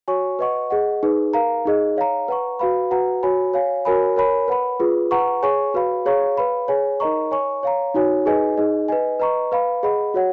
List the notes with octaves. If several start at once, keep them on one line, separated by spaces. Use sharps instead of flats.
F#4 C#5 G#5 C#6
B4 D#5 F#5 C#6
G#4 D#5 F#5
D#4 G#4 B4
A#4 F5 A#5
D#4 G#4 D#5
C#5 F5 A#5
B4 F#5 A#5 C#6
F#4 B4 F5 B5
F#4 B4 F#5 A#5
F#4 C#5 G#5 B5
C#5 F5 G#5
F#4 A#4 C#5 G#5 B5
A#4 C#5 G#5 B5
B4 F#5 B5
F4 G#4 B4
B4 F#5 A#5 C#6
G#4 C#5 G#5 C#6
F#4 B4 F5 B5
G#4 C#5 F5 A#5 C#6
B4 F5 B5
G#4 C#5 G#5
D#4 A#4 D#5 A#5 C#6
C#5 G#5 C#6
C#5 F5 A#5
D#4 F#4 C#5 G#5
D#4 G#4 B4 D#5 G#5
D#4 G#4 D#5
B4 D#5 G#5
B4 D#5 A#5 C#6
B4 F5 B5
G#4 D#5 F#5 B5
F#4 C#5 F#5